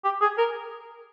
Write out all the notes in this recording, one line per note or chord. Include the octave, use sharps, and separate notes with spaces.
G4
G#4
A#4